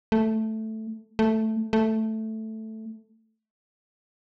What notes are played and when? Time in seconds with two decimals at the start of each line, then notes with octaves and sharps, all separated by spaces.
0.12 A3
1.19 A3
1.73 A3